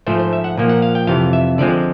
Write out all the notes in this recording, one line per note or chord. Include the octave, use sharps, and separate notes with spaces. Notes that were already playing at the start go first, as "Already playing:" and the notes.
G#2 F3 A3 C5
C5
E5
F#5
A#2 F3 A#3
F#5
F5
G5
F2 C3 E3 F5
E5
D3 F3 G#3 C4 D5